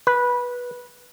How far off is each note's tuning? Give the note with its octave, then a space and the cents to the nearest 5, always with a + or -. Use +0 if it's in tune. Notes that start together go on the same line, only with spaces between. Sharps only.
B4 -15